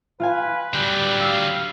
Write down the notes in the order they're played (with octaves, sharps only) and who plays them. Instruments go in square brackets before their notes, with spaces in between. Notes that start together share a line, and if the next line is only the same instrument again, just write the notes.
[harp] F4 F5 G#5 [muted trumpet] B4
[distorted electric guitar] D3 F#3 [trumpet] G3 [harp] G6
[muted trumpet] F5 [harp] E6